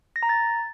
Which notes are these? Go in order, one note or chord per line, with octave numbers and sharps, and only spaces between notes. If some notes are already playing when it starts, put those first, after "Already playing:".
A#6
A#5
A6